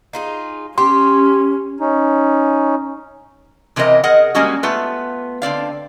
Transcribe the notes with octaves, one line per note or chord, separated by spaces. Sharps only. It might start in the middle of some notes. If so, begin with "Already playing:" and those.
D#4 F4 G#4
C#4 G4 C6
C#4 D#4
C3 E3 C4 A#4 D#5
G#4 A#4 D#5 F#5
G3 G#3 A#3 C#4 F#4
A3 B3 F4 B4
D3 C4 D5 F5